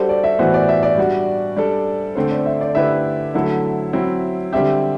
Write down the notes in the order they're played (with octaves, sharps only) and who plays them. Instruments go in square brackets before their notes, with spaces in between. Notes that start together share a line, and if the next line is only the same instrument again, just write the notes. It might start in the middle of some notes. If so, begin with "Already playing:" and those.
Already playing: [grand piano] G3 D4 F#4 A4 [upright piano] G4 C5
[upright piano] D5
E5
[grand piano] A2 E3 B3 F#4 B4 [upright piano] C5
[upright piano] D5
E5
D5
[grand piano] G3 D4 F#4
G3 D4 A4
[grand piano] D3 A3 C4 [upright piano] C5
[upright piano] D5
E5
D5
[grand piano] D3 A3 E4 G4 B4 [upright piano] E5
[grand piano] D3 F#3 A3 E4 A4
F#3 C4 E4
[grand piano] D3 G3 C4 G4 [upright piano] E5